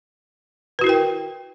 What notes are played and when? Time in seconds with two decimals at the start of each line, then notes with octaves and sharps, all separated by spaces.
0.79 B4
0.81 F#4
0.84 E4
0.87 A#4
0.89 G5